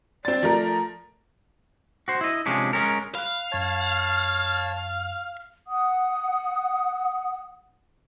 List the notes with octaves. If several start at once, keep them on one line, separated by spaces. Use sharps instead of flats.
C4 D5 A6
F3 A3 A#4
F#4 C5
E4 D#5
C3 F3 G#3 C#4 D4
G#3 C#4 A#4
F5 B5 F#6
F#2 C#5 A5 G#6
F#5 D#6